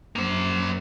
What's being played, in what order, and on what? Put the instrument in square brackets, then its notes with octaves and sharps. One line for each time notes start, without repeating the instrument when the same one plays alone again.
[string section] F#2 [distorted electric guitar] A#3 C5